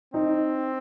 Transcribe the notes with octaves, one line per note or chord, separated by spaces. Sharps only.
C4 D#4